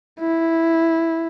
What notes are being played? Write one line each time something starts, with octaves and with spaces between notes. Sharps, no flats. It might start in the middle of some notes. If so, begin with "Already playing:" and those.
E4